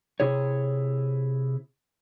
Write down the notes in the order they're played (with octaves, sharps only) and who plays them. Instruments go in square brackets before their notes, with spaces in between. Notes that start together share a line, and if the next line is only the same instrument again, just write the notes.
[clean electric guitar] C3 E4 G#4 C#5